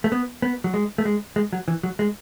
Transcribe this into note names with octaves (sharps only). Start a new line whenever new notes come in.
A3
B3
B3
F#3
G#3
A3
G#3
G#3
F#3
E3
F#3
G#3